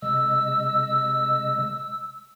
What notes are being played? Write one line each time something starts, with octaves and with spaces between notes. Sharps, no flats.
C3 G#3 D#5 E6